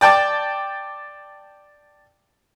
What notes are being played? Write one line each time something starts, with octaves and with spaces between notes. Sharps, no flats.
D5 G5 A5 D6